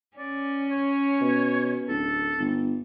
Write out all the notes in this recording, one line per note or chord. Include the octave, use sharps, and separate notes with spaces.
C#4 D5
C#5
B2
D1 A4
G1